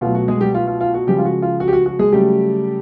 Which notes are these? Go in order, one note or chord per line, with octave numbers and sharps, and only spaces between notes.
B2 F#3 A3 F4
F#4
G#3 G#4
G3 G4
F4
F4
F4
F#4
C#3 F3 G3 G#3 G4
F4
F#4
F4
F#4
G4
F#4
F#4
G#3 G#4
C#3 F#3 G3 A3 G4